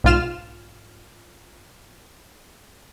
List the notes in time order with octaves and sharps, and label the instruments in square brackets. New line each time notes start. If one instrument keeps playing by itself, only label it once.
[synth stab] B1 G#2 F4 F6 E7